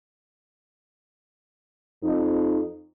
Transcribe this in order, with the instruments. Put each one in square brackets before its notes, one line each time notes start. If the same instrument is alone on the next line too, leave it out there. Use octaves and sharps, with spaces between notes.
[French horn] F2 [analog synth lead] D#4